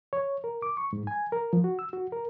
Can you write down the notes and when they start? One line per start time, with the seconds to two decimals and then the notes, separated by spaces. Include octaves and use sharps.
0.13 C#5
0.44 A#4
0.62 D6
0.77 C#6
0.93 G#2
1.07 G#5
1.32 A#4
1.53 F3
1.64 F#4
1.79 E6
1.93 F#4
2.12 A#4